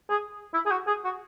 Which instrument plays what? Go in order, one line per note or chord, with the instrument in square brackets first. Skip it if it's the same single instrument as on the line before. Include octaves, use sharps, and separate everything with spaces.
[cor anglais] G#4
E4
G#4
F#4
G#4
F#4